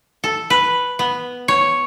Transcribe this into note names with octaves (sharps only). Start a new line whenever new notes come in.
A4
B4
B3
C#5